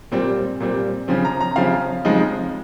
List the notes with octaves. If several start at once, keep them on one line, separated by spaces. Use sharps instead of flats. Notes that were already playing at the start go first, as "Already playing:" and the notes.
A#2 G3 C4
A#2 G3 C4
C#3 F3 C4
A#5
A#5
C#3 F3 C4 F5
C#3 F3 G#3 C4 D#4